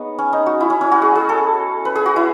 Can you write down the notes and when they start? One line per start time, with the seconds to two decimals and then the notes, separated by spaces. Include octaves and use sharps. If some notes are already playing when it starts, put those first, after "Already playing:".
Already playing: B3 D#4 G#4 C#5 F#5
0.19 C#4
0.33 D#4
0.46 F#4
0.60 E4
0.70 C#4
0.81 C#4
0.92 F#4
1.02 G#4
1.15 G#4
1.29 A4
1.85 B4
1.95 G#4
2.06 F#4
2.16 E4